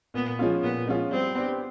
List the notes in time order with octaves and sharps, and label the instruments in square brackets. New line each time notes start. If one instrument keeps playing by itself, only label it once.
[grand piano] A#2 [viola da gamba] B3
[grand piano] F3 G#3 C#4 F4
[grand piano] A#2 [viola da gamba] B3
[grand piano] F3 G#3 C#4 F4
[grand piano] G3 [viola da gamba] C4
[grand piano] B3 D4 G4